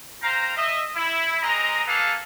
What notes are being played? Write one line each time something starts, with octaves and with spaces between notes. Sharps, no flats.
C5 F5 G5 A#5
D#5 E5
E4
G#3 C4 D#5 A#5
A#3 B3 G#4 A4 B4 F5